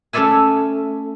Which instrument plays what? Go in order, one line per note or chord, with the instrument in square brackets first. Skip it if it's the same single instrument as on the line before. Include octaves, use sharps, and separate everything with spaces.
[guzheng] A3 C#4 C#5 D5 E5 G#5